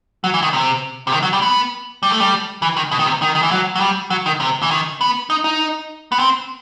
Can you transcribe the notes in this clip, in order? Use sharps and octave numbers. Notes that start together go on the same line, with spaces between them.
F#3
E3
D#3
C3
C3
D#3
F#3
G3
B3
G3
A3
G3
E3
D#3
B2
D#3
C3
D#3
D#3
E3
F#3
F#3
G3
F#3
D#3
C3
E3
D#3
B3
D#4
D#4
B3
C4